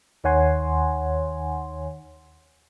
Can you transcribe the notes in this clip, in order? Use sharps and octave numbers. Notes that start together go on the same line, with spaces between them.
D#2 D#3 C#5 F#5 G#5 C6